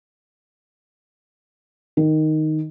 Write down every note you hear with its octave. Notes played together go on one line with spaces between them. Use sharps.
D#3